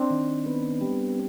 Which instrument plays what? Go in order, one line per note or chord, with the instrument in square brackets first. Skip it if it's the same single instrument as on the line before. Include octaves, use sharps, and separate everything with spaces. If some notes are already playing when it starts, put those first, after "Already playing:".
Already playing: [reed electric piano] C4 D4
[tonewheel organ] D#3
B3
G3